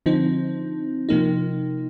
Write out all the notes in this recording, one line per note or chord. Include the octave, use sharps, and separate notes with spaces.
D3 F3 C4 D#4
C3 F3 A#3 D#4